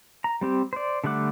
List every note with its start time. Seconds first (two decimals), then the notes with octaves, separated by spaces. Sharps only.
0.24 A#5
0.41 G3 C4 G4
0.73 C5 D5
1.04 D3 G3 A3 F#5 D6